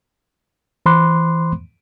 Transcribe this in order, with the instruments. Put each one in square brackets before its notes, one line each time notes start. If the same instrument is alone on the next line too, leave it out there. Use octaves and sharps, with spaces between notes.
[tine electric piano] E3 C5 B5 C6 D6 F#6